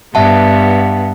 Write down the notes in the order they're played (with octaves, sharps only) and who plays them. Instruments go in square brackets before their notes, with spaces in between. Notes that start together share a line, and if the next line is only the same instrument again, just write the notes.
[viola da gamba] G2 B3 [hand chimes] E5 F#5 A5